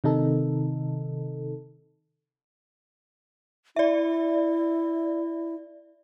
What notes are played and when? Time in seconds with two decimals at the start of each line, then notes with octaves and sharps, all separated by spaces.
0.04 C3 D#3 D#4 A4
3.76 E4 D5 E5